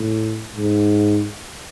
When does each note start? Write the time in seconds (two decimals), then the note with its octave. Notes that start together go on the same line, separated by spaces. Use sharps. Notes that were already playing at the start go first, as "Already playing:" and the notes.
Already playing: A2
0.56 G#2